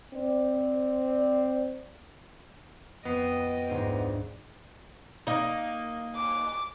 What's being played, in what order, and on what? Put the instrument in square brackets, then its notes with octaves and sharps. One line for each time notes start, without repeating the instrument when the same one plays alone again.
[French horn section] C4 D5
[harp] F2 B6 C7 [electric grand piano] B3 [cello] D#5 G5
[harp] D2 G#2 C5
[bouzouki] A#3 D#4
[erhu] D6